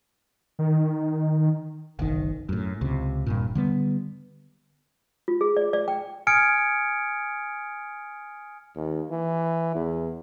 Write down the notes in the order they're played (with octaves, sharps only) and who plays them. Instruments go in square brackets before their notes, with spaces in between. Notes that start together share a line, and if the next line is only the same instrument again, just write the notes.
[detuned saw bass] D#3
[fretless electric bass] F#1 B1 D#3
F#2 A2
C#2 C3
D#1 G2 A#2
D3 G3 B3
[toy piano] F4
G#4
D5
D5
G5
[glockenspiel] G#5 D#6 F6 G#6 C#7 D7
[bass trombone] D#2
E3
E2